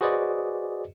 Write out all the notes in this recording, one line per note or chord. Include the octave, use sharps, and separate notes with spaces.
F#4 G#4 B4 C5 D5 D#5